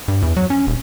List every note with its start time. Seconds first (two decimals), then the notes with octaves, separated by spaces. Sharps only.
0.08 G2
0.22 E2
0.37 F#3
0.50 C#4
0.67 D#1